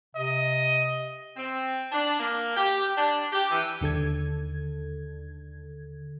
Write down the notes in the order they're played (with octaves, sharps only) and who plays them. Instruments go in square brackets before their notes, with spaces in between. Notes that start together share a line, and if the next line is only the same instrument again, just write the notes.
[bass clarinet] C3 [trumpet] D#5
[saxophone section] C4
D4
A#3
G4
D4
G4
E3
[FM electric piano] D#2 D3 A4 G#6